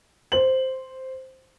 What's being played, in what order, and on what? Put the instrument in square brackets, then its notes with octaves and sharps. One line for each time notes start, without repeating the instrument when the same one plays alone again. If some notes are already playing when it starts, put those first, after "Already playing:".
[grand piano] C5 F#7